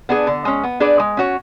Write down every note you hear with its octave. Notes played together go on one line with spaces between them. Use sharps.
B3 D4 G#4
D3
G#3 C#4
B3
D4 G#4 B4 D5
G#3
C#4 F#4 C#5